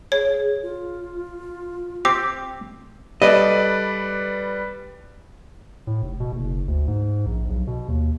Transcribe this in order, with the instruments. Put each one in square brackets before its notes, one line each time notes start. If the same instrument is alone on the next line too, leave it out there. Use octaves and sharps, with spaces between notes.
[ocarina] G#4 [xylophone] C#5
[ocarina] F4
[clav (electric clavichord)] C4 G4 [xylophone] D6
[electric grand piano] G3 B4 D5 [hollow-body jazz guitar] A4 D#5
[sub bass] A2
F1
B2
F#1
D2
G#2
A#1
B1
B2
D#2